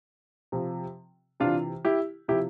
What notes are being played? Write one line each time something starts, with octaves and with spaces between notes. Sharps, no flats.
C3 F3
C3 E3 D4 F4
E4 G4
C3 F3 E4 G4